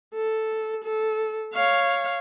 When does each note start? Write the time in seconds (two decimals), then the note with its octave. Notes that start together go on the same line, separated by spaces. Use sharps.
0.14 A4
0.84 A4
1.54 C#5 F5